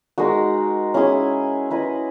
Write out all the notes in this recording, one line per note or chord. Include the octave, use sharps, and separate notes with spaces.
G#3 D#4 F#4 A#4
C#4 E4 G#4
E4 B4 D#5